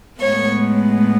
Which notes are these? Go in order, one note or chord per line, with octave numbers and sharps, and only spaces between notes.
A2 G#3 B3 C#5